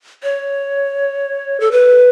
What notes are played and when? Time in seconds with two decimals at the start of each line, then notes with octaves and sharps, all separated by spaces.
0.23 C#5
1.60 A4
1.72 B4